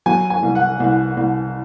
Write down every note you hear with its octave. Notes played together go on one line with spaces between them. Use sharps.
F#3 G#5
G#5
C2
F#5
C2
C2